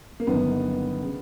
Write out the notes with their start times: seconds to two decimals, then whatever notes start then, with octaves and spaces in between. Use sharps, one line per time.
0.20 A#3
0.27 G1 F#2 D#3 B3
1.03 C#3